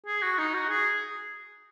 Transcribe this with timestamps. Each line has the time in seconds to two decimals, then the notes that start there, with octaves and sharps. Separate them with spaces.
0.06 G#4
0.22 F#4
0.38 D#4
0.54 F#4
0.69 G#4